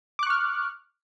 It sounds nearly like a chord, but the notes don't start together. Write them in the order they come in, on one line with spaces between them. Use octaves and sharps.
D6 F#6 C#6 F6